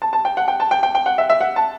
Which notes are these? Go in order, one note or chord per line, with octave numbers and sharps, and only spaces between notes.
A5
A5
G5
F#5
G5
A5
G5
G5
G5
F#5
E5
E5
F#5
A5